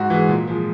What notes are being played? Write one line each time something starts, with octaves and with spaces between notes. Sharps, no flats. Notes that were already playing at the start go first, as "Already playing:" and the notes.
Already playing: G#2 F#4
E3 G#3
A#2
F3 G#3